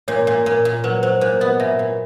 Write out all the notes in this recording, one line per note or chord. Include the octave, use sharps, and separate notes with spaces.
A#2 C#5
A#2
A#2
A#2
F#3 B4
F#3 C5
A#2 C5
B3 D#5
A#2 E5
A#2